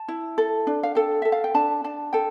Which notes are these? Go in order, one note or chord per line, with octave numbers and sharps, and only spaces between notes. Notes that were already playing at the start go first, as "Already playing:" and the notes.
Already playing: A5
E4
A4
D4
F5
A4 G5
A4 E5
F5
G5
D4 A5
D4 A5
A4 G5